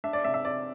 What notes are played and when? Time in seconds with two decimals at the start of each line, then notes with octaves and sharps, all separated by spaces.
0.04 D4 E5
0.13 D5
0.24 C3 E5
0.34 E5
0.45 C3 D5